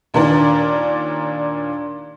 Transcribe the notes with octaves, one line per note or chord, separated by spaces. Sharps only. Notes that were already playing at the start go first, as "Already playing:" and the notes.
D#2 A#2 D#3 D4 A#4 D5